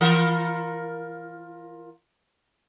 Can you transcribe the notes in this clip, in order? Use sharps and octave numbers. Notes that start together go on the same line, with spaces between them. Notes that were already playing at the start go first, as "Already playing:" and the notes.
E3 F4 A#4